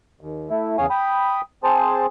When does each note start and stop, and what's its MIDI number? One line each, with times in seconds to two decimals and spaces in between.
0.21 0.50 39
0.50 0.76 57
0.50 0.76 64
0.78 0.86 40
0.78 0.86 49
0.78 0.86 73
0.78 0.86 77
0.78 0.86 80
0.78 0.86 87
0.90 1.41 79
0.90 1.41 83
0.90 1.41 87
1.64 2.06 60
1.64 2.06 68
1.64 2.06 72
1.64 2.06 81